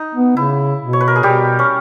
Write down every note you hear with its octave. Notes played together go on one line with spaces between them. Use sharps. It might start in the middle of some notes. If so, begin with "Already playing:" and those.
Already playing: D#4
B3
C#3 E4
B2
C#5
B4
A#4
G#4
B2 G3 G4
C#4